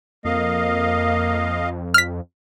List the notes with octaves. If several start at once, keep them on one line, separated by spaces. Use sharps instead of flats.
F2 A#3 D#5 F5
F6 B6